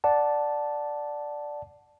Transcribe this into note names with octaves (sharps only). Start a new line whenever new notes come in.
D5 F#5 A5